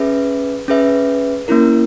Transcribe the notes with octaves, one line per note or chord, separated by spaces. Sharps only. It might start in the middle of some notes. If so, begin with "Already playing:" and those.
Already playing: C#4 G#4 B4 E5
C#4 G#4 B4 E5
A#3 C#4 E4 A#4